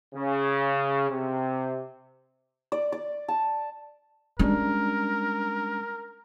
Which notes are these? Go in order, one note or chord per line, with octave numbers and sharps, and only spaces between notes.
C#3
C3
D5
D5
A5
G3 G#3 C#4 D4 A#4